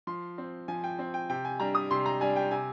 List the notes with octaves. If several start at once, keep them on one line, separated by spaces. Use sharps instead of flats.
F3 C6
C4
F3 G#5
G5
C4
G5
C3 G5
G#5
G3 D4 A#5
D#6
C3 C6
A#5
G3 D4 G#5
G5
C3 G#5